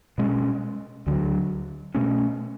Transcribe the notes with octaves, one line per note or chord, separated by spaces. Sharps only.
B2 G#3 C#4
D2 D3 F#3
B2 A3 C#4